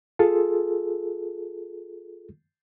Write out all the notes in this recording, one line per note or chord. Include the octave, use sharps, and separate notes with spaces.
F4 G#4 A4